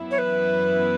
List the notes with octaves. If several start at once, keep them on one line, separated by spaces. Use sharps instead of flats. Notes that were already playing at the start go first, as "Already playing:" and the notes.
Already playing: F#2 E3 B3 E4
C#5
B4